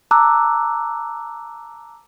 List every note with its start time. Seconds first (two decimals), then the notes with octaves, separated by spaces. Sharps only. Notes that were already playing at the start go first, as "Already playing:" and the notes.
0.11 A5 A#5 D6 E6 F#6